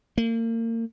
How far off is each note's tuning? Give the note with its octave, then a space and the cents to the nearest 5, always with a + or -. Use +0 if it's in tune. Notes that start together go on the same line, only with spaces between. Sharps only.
A#3 -35